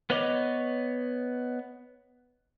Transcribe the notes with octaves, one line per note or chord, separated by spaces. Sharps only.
B3 B4 C#5 D#5 D6